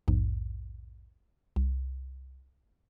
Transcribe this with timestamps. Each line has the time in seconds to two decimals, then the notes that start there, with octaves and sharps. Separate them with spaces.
0.08 A#1 E2 G#2
1.56 C2